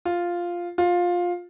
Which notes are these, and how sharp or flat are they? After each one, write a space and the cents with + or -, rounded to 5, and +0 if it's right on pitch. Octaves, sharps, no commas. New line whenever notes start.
F4 +0
F4 +15